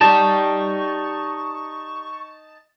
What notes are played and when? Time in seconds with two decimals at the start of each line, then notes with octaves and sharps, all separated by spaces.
0.01 D#4 G4 D5 A5 C#6